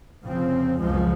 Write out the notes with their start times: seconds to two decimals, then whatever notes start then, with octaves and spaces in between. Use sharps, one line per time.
0.24 F1 C#3 F3 C4
0.80 C#2 F#2 B2 F3 G#3